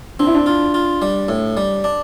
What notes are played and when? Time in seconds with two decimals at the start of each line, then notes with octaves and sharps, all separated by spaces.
0.20 C4 D4
0.27 E4
0.35 D4
0.46 F4
0.74 F4
1.02 G3
1.29 A2
1.57 G3
1.84 D4